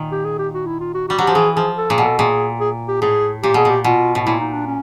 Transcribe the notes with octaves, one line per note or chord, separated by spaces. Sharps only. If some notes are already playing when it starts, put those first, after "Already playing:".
Already playing: A#2 D#3
G4
G#4
G4
F#4
E4
F4
F#4
G3 F#4
F#3 G4
F3
E3 G#4
F3 G#4
A4
A#2 G#4
B2
A4
A#2 G#4
G#4
G4
A2 G#4
A#2 G4
B2 G#4
A#2
G4
B2 F4
A2
A#2 E4
D#4
D4
C#4